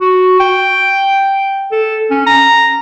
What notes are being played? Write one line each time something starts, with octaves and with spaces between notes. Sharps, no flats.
F#4
G5
A4
C#4
A#5